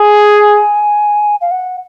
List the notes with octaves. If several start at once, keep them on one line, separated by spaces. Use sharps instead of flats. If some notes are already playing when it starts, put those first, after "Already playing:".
Already playing: G#4 G#5
F5
F#5